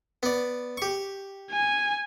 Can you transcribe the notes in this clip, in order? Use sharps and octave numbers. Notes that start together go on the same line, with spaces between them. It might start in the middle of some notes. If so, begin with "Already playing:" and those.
B3 D5
G4 C#6
G#5